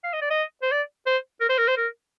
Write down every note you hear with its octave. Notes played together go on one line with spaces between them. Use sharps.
F5
D#5
D5
D#5
C5
D5
C5
A#4
C5
A#4
C5
A#4